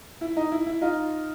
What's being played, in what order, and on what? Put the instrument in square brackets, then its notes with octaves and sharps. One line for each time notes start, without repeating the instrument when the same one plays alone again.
[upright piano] E4
D#4
E4
E4
D#4 F4